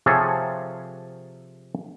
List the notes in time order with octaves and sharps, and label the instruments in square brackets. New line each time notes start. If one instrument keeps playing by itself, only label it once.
[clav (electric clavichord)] C3 F3 G#4 A4 C#5